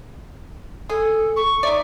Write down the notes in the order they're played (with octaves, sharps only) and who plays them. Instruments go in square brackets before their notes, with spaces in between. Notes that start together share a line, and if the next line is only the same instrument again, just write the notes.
[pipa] G#4 [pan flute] A4
[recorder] C#6
[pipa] D#4 D5 [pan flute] E5